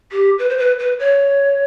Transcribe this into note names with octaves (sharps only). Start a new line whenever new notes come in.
G4
B4
C5
B4
B4
C#5